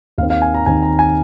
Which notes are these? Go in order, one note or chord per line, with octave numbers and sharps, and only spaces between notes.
D#2 D#3 C4 F5
F5
G#5
A#5
D#2 D#3 C4 G#5
A#5
G#5